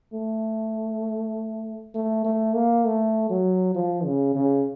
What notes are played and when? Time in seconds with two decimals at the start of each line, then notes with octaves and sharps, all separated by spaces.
0.14 A3
1.95 A3
2.25 A3
2.55 A#3
2.85 A3
3.30 F#3
3.75 F3
4.05 C#3
4.35 C#3